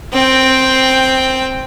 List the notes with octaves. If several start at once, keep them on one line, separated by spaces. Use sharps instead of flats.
C4 G5